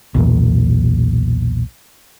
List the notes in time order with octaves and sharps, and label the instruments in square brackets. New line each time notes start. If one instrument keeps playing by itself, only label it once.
[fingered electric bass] B1 E2 A#2